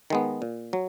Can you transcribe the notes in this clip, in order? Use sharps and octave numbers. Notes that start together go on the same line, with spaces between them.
D#3 G#3 B3
A#2
F#3